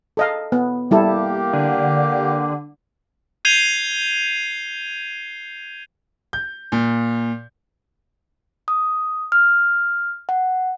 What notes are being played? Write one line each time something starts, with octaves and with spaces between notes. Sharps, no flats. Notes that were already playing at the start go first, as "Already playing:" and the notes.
A4 D#5 F5
B3
G3 A#3 E4 G4 A4
D3
G6 G#6 C7 D#7 F7 G7
G6
A#2
D#6
F6
F#5